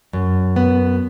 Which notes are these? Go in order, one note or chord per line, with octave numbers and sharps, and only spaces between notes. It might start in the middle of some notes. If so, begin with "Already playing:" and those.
F#2
B3